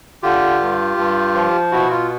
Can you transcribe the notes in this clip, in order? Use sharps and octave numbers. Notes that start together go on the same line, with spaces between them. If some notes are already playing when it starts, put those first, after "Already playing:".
D3 F4 G4
G2
G2
F3
B2 E4 F#4
F4